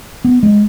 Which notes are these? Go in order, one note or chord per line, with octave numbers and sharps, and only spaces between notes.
B3
G#3